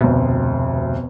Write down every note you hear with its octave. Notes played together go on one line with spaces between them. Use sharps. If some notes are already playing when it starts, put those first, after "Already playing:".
F1 D2 B2